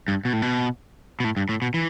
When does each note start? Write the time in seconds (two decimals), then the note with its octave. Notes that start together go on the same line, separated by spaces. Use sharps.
0.08 G2
0.25 B2
0.33 A2
0.42 B2
1.20 B2
1.24 A2
1.37 G2
1.49 A2
1.62 B2
1.74 E3